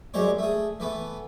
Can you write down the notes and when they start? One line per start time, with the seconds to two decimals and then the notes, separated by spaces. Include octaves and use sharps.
0.14 F#2 G3 G#3 C5 C#5
0.39 A3 G#4
0.80 E3 A3 B3